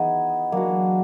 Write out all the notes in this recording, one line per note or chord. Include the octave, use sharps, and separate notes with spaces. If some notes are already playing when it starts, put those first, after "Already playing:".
Already playing: E3 B3 D#4 G#4
F#3 G#3 A#3 D4 F#4